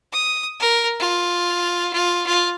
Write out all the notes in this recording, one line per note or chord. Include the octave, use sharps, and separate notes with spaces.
D#6
A#4
F4
F4
F4